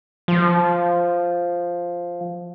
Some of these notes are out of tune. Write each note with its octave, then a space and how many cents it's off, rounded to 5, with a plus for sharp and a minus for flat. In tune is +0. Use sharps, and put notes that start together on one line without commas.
F3 +0